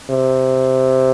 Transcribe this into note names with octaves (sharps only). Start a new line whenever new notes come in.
C3